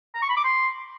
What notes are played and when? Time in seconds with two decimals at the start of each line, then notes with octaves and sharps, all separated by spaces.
0.15 A#5
0.22 C#6
0.29 B5
0.37 D6
0.44 C6